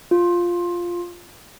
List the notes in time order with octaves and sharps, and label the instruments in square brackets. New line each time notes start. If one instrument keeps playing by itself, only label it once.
[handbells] F4